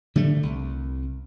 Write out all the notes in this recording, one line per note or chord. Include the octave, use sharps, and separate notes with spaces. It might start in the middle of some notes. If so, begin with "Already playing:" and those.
D3 G3 A3
C2